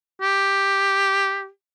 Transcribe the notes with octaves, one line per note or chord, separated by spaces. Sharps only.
G4